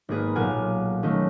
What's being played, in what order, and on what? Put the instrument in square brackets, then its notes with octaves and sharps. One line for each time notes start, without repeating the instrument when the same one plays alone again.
[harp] G#1 A#3 G#4 B4
B1 A#2 F5 F#5 G#5 D6
D#3 G#3 A3 C#4